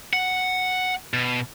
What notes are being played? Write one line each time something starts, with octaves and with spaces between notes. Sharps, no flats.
F#5
B2